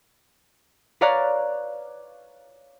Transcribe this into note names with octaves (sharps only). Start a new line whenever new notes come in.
B4 C#5 D5 F5 A#5 F#6